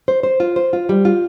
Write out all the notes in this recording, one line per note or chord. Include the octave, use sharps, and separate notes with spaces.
C5
C5
F4
C5
F4
G3
F4